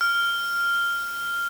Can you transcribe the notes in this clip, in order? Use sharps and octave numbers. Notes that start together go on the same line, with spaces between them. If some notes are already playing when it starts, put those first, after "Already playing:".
F6